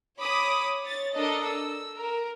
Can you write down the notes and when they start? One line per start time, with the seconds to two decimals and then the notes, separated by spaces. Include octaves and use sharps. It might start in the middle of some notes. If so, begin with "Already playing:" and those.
0.18 C#5 B5 D6 D#6
0.83 C#5 A6
1.14 D4 A4 A#4 D#5
1.45 E6
1.96 A#4